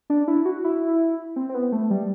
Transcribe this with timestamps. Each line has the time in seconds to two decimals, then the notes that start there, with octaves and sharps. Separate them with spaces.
0.10 D4
0.28 E4
0.45 F#4
0.64 E4
1.36 C4
1.49 C4
1.54 B3
1.72 A3
1.90 G3